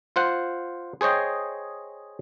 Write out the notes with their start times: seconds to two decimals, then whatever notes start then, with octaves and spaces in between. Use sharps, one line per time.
0.16 F4 C5 F#5
1.01 G#4 C5 C#5 D#5 G5